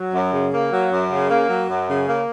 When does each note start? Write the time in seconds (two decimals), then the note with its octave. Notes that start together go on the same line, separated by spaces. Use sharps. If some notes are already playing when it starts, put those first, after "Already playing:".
Already playing: F#3
0.13 F#2
0.33 C#3
0.52 A#3
0.71 F#3
0.91 F#2
1.10 C#3
1.29 A#3
1.49 F#3
1.69 F#2
1.88 C#3
2.07 A#3